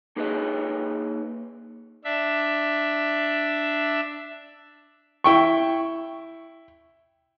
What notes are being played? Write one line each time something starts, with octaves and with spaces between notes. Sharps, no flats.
A#3 D#4 G#4 B4 C#5 D#5
D4 E5
E4 G5 C#6